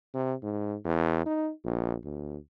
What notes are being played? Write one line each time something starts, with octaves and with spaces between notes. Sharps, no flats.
C3
G#2
E2
D#4
A#1
D2